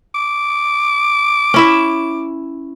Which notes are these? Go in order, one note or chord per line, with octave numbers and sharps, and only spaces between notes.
D6
C#4 E4 E5